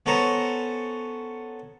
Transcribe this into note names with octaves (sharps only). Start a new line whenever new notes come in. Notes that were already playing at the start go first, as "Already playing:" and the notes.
B3 C#4 A4 C5 A#5 C6